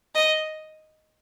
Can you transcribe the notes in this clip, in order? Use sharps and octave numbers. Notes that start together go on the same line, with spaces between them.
D#5